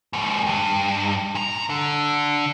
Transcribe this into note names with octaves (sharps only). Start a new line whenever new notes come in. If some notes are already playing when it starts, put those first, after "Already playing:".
D#2 G#2
G2
A#2 A#5
D3